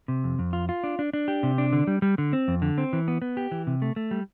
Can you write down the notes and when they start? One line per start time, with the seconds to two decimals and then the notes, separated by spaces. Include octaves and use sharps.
0.08 C3
0.24 F2
0.39 F2
0.53 F4
0.69 F4
0.84 D4
0.99 D4
1.13 D4
1.28 G4
1.43 C3
1.58 D4
1.73 D3
1.87 G3
2.02 G3
2.18 D3
2.33 C4
2.48 F2
2.62 D3
2.78 C4
2.93 E3
3.08 B3
3.22 B3
3.37 G4
3.51 E3
3.67 C3
3.82 A3
3.96 A3
4.11 G3